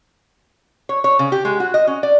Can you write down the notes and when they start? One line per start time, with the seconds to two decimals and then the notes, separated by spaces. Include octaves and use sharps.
0.89 C#5
1.04 C#5
1.19 C#3
1.32 G4
1.45 G#3
1.60 F#4
1.74 D#5
1.87 C#4
2.03 D5